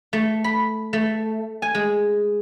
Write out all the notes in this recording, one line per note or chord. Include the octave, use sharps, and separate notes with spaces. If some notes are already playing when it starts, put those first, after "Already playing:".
A3
B5
A3
G#5
G#3